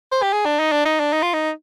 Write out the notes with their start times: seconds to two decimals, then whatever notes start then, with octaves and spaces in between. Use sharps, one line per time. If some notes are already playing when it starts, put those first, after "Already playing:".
0.12 C5
0.23 G4
0.33 G#4
0.45 D4
0.59 D#4
0.72 D4
0.85 D#4
1.00 D4
1.13 D#4
1.23 F4
1.34 D#4